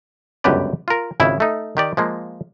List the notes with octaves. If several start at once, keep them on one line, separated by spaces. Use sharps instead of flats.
G1 C#2 F#2 G4 B4 D5
F4 A#4
G#1 C#2 C#3 E4
A3 D#4
D#3 G4 D5
F3 G#3 A#3